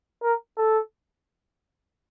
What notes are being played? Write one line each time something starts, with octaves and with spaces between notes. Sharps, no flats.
A#4
A4